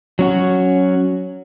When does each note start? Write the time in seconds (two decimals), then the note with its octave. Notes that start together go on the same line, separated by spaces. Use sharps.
0.19 F#3 C#4 F#4